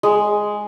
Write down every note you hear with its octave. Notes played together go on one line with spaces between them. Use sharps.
G#3